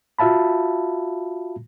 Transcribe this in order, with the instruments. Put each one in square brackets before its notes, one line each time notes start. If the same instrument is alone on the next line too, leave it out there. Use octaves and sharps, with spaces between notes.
[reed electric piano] F4 F#4 E5 F5 A5 B5